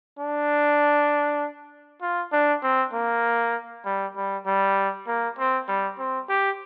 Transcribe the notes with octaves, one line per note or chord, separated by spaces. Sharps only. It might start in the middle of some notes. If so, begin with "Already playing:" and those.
D4
F4
D4
C4
A#3
G3
G3
G3
A#3
C4
G3
C4
G4